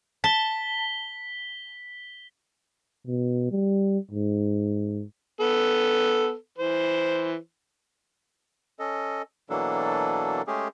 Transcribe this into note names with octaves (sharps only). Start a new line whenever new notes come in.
A5 B6 G7
B2
G3
G#2
B3 A4
E3 C5
C#4 A4 D#5
B2 E3 F#3 A#3 D4 A4
G#3 A3 C#4 G4 G#4